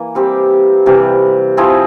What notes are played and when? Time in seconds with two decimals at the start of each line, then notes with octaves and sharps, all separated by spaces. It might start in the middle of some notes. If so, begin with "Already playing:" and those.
Already playing: E3 A#3
0.15 G3 C4 G4
0.86 C3 E3 G3
1.57 F3 C4 E4 G#4